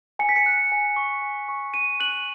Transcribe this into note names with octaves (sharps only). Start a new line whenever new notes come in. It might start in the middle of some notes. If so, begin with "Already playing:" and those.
G#5 C#7
B6
C#7
F#6
G#5
C#6
G#5
C#6
G#5 D#7
F#6 F#7